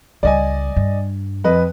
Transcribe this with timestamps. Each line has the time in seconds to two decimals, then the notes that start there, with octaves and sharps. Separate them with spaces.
0.23 C#2 G3 D5 D#5 G#5
0.77 G2
1.44 F2 B4 D#5